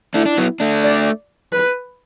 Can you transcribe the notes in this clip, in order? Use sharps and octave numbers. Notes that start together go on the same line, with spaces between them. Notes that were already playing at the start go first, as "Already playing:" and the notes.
A3 D4 E4
D4
F#3 B3
A3 D4
D5
B4